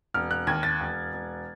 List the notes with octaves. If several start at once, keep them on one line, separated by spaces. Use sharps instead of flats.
E1 F6
F#6
D#2 G#6
A6
E1
E1